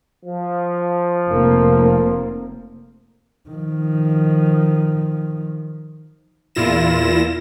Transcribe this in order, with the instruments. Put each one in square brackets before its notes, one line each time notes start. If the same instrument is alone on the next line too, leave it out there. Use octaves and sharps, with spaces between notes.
[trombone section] F3
[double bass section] F1 A#3 C4
[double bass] D#3 F3
[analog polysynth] E2 A#2 E4 F4 A#6 E7